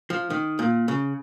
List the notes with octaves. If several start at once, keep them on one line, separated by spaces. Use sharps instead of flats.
F3
D#3
A#2
C#3